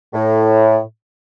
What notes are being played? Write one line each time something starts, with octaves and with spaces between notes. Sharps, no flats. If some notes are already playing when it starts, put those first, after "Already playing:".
A2